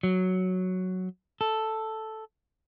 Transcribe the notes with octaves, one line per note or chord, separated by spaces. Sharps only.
F#3
A4